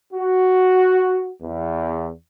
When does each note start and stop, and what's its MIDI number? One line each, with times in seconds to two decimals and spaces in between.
0.13 1.30 66
1.42 2.11 40